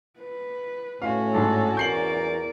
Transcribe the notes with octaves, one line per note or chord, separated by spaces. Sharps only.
B4
A2 C#4 F#4 F5
G#2 D4 A4
E2 A#4 D5 G6 C7 F#7